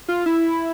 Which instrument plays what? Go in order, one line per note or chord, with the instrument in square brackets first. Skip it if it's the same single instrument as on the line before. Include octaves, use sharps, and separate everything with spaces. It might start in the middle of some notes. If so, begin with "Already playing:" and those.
[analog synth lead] F4
E4